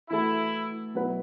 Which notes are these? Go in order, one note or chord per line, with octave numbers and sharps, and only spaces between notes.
E3 A3 E4 F#4 A4
B2 F#3 B3 E4 B4